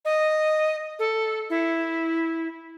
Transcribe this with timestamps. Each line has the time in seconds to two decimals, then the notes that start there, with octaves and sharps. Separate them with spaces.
0.05 D#5
0.99 A4
1.50 E4